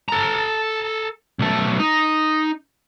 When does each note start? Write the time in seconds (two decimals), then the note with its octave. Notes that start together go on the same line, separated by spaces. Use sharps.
0.09 A4 A#5
1.39 B1 A3
1.79 D#4